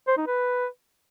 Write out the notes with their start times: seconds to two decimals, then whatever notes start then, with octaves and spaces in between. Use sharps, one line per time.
0.08 C5
0.17 D#4
0.27 B4